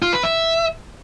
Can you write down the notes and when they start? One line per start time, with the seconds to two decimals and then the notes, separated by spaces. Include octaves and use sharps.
0.02 F4
0.13 B4
0.23 E5